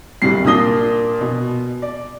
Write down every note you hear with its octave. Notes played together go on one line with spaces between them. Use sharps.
D1 A#2 F#3 G3 C7
A#2 A#3 D4 D#6 A#6 G7
B2
D5